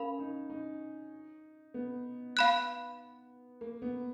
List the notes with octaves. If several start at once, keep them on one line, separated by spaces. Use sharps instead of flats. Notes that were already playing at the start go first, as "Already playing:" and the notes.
Already playing: C#4 A#4 F5 B5
D#4
D#4
B3
F5 B5 F#6
A#3
B3